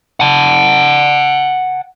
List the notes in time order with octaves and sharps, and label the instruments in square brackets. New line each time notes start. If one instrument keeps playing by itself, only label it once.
[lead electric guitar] F#5 A5